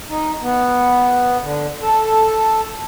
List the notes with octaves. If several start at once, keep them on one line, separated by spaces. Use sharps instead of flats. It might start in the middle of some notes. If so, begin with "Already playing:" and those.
D#4
B3
D3
A4